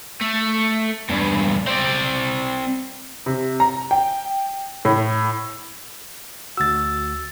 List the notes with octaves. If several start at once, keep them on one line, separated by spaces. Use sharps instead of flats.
A3
E2 G2
C4 D5
C3
A#5
G5
A2
D2 F#4 E6 A6